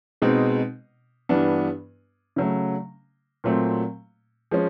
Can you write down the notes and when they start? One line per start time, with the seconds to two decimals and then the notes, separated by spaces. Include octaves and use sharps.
0.22 B2 G#3 C4 D#4
1.29 G2 E3 G3 B3 D4
2.36 C#3 F#3 A3
3.44 A#2 F#3 A3 C4
4.51 F3 G#3 C#4